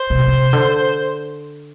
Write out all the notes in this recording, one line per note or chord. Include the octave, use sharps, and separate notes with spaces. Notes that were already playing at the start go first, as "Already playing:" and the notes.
Already playing: C5
C3
B2
C3
D3